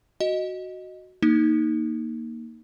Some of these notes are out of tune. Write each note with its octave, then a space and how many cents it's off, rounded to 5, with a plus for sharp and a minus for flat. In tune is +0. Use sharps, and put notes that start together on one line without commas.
F#4 +0 D#5 +0
A#3 +0 D#4 +0